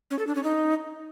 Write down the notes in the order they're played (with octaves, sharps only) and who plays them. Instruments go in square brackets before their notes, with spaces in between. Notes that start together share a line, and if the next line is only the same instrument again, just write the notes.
[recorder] C#4
A4
D4
C#4
D#4